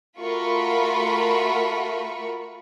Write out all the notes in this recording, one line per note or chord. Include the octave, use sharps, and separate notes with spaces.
A3 F4 F#4 A#4 B5 C#6